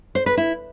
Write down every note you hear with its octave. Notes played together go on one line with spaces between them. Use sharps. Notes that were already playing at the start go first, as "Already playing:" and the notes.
C5
B4
E4